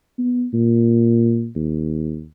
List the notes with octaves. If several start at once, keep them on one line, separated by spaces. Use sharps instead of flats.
B3
A#2
D#2